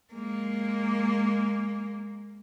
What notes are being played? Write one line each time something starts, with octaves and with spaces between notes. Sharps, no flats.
G#3 A#3